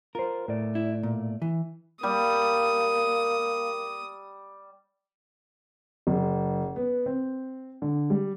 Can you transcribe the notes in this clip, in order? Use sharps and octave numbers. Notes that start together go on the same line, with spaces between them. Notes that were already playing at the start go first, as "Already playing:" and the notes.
F4 A#4 C5
A2 A3 D5
E4
A#2
E3
G3 A#3 D#6
F#1
B3
C4
D3
G3